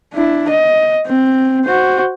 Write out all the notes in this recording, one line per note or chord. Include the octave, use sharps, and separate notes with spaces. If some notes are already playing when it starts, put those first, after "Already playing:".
D4 E4
D#5
C4
F#4 C5